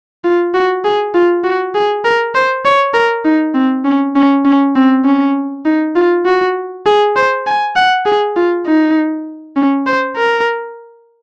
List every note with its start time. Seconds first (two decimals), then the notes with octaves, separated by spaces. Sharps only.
0.25 F4
0.54 F#4
0.85 G#4
1.14 F4
1.44 F#4
1.75 G#4
2.05 A#4
2.35 C5
2.65 C#5
2.94 A#4
3.25 D#4
3.54 C4
3.85 C#4
4.16 C#4
4.45 C#4
4.76 C4
5.05 C#4
5.66 D#4
5.96 F4
6.26 F#4
6.86 G#4
7.16 C5
7.47 G#5
7.76 F#5
8.06 G#4
8.36 F4
8.67 D#4
9.57 C#4
9.87 C5
10.17 A#4